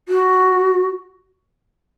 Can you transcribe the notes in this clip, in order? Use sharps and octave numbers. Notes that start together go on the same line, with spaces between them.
F#4